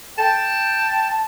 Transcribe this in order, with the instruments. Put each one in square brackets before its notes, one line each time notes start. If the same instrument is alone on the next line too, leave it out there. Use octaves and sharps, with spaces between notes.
[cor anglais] G5 [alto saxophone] A5